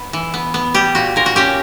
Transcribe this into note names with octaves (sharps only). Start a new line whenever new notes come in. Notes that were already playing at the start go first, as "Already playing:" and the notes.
Already playing: B3
E3
B3
B3
G3 G4
A#2 F#4
A#2 A#4
F#4
C#4 G4